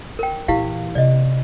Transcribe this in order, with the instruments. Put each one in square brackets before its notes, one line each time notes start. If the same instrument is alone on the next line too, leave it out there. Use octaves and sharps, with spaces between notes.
[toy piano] A#4 G5
[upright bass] A#2 E3 [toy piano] E4 G4 F5
[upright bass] C3 [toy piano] D5 D#5